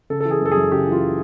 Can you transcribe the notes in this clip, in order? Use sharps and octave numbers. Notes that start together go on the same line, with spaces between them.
C#3 A4
E3 A4
G#4
F#2 A4
F#2 G#4
C#3 G4
E3 F4